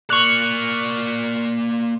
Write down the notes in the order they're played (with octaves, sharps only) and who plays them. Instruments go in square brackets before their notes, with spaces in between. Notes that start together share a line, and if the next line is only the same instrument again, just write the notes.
[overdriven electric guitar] A#3 D5 [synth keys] C#6 F6 F#6